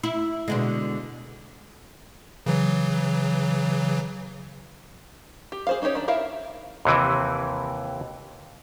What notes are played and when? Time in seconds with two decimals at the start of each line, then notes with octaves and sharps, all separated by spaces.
0.03 E4
0.48 B2 D3 G#3
2.46 C#3 E3 F#3
5.52 G4
5.67 G#4 C5 F5
5.82 C#4 D#4 E4 G4 C#5
5.95 D#3 D4
6.08 E4 A#4 E5 F5
6.85 D#2 C3 E3